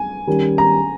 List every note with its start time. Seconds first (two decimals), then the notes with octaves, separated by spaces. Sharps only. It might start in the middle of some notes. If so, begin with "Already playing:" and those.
Already playing: G#5
0.27 D#3 G3 C#4 G4 A#4
0.58 A#5